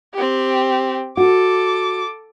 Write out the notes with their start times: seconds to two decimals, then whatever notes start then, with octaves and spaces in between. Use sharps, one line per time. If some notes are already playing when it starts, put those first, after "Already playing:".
0.14 C4 G4
1.17 F#4 A4 D6